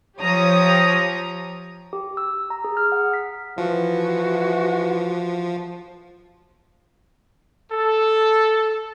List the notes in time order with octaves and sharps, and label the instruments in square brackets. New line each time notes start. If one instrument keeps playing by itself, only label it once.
[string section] F3 G4 C#5 A#5 D#6
[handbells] G4
E6
A#5
G#4
F6
F#5
B6
[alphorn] E3 [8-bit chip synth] F3 [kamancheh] F#4
[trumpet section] A4